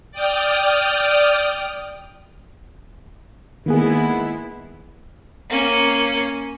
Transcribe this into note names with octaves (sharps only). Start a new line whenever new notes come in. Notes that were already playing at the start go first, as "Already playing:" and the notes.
D5 G5 D#6 F6
D#3 G#3 A#3 B3 E4 G#4
A#3 C#4